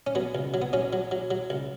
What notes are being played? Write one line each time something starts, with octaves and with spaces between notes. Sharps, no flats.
C#4
F#3 B3
C#2
F#3
B3
F#3 C#4
F#3
F#3
F#3
C#2